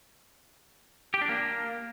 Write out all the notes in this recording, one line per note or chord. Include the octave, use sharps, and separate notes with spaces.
G4
D4
A#3